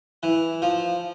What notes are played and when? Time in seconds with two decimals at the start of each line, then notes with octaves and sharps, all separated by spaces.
0.23 E3
0.62 F3